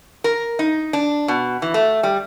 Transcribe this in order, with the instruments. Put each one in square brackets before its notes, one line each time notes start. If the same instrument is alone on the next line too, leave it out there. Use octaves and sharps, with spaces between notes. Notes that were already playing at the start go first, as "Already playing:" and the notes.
[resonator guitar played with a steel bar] A#4
D#4
D4
B2
E3
A3
G3